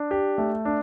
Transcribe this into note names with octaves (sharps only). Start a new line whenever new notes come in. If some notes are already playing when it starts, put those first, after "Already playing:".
Already playing: D4
G4
A3
D4